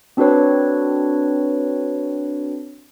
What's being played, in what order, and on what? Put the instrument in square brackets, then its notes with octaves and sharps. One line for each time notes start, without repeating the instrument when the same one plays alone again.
[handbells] C4 D4 F#4 A4 B4 C#5